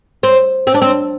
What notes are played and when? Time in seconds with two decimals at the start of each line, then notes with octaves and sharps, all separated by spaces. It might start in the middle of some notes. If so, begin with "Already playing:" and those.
0.23 C4
0.67 C4
0.74 D4
0.82 C4